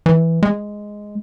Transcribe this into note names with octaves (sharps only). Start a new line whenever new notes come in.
E3
G#3